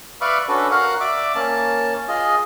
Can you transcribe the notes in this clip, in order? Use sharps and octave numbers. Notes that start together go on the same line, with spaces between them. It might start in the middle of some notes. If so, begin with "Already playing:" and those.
B4 D5 E5 F5 B5 C#6
C#4 D4 F#4 A4 B4
F#4 A#4 F5 F#5
D5 E5 D6
A#3 C#4 A5
F4 G#4 D#5